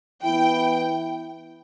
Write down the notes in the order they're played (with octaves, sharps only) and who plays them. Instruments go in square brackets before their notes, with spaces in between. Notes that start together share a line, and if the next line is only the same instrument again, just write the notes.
[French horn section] E3 B3 E4 [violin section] G5